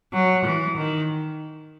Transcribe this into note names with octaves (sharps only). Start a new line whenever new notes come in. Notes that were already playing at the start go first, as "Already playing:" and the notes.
F#3
E3
D#3